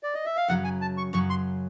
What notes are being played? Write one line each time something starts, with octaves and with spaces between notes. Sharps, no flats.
D5
D#5
E5
F5
F#2 C#3 F#3 F#5
G#5
A5
C#6
F#2 C#3 F#3 C#6
C6